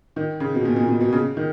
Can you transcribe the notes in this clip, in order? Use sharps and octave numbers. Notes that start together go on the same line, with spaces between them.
D#3
C#3
B2
A#2
A#2
A#2
B2
C#3
D#3